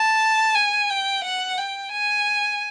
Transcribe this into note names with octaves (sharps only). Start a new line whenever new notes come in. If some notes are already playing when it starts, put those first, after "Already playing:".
Already playing: A5
G#5
G5
F#5
G5
G#5